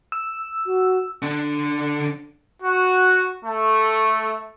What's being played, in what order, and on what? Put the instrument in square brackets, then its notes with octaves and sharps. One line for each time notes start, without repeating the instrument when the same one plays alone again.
[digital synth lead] E6
[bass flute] F#4
[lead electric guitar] D3 D4
[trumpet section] F#4
A3